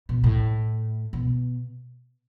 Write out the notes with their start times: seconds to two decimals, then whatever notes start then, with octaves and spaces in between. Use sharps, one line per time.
0.09 B2
0.24 A2
1.13 B2